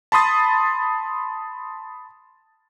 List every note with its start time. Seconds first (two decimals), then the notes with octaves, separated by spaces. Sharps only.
0.12 A5 B5 C6 D#6 A6